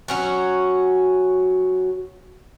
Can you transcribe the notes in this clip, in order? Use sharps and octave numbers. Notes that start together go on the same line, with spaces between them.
F#3 C#4 F#4